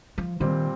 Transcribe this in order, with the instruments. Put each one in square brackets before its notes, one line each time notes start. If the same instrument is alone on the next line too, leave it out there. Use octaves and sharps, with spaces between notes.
[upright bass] F3
[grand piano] A#2 G3 C4 G4 [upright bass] D#3